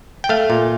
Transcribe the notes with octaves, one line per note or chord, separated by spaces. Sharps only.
G5
A3 F5
A#2